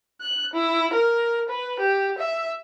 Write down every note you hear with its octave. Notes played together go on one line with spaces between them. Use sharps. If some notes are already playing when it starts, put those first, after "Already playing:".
F#6
E4
A#4
B4
G4
E5